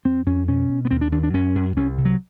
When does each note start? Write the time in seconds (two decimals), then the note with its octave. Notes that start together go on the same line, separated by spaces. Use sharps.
0.05 F2 C4
0.26 F2 C#4
0.48 B2 C#4
0.69 B2
0.85 B3
0.91 D#2 C4
1.01 D4
1.12 D#2 D4
1.23 D4
1.34 F#2 C#4
1.55 F#2
1.76 C2 C#4
1.98 C3
2.05 F#3